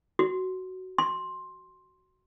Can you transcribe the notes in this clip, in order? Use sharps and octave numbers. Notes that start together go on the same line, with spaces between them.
F#4
C6